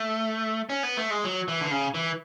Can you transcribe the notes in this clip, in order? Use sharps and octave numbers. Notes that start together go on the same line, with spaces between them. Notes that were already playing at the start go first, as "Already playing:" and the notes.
Already playing: A3
C#4
B3
A3
G#3
F#3
E3
D3
C#3
E3